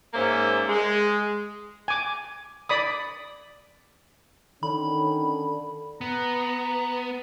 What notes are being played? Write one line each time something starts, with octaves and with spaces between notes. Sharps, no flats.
G#2 A#3 C#4 C5 D5 E5
G#3
G#5 D6
D5 B5 D#6
D3 D#3 C#4 B5
B3 A#5